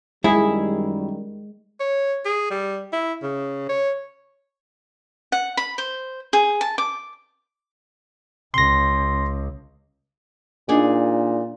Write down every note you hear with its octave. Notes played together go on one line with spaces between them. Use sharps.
F#2 D#3 G3 G#3 E4 G#4
C#5
G#4
G3
E4
C#3
C#5
F#5
B5
C5
G#4
A5
D6
C#2 C6 A#6
A#2 D4 D#4 G#4